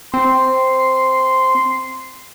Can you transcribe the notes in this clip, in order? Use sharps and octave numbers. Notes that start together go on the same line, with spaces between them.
C4 C6